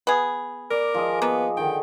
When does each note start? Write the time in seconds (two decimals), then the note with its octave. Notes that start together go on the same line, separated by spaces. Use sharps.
0.07 B3 G#4
0.71 A#4 D5
0.94 F3 G#4 D#5
1.22 A#3 B3
1.57 D3 D#3 G5